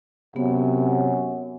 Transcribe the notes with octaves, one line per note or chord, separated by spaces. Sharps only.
F#2 C3 B3